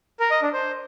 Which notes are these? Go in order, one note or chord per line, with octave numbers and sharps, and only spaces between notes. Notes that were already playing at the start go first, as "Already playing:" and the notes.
A#4
D#5
D4
C5